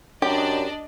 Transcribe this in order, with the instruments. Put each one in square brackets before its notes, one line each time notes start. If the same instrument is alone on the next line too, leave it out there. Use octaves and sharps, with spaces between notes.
[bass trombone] F#2 [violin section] D4 D5 D#5 [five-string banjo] G4